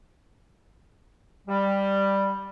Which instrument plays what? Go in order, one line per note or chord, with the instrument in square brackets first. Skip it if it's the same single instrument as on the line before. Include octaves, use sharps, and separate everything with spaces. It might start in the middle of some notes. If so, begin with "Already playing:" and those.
[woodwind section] G3